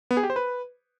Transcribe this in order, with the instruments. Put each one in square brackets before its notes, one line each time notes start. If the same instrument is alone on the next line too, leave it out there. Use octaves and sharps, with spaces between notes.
[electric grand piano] B3
G#4
G4
C5
B4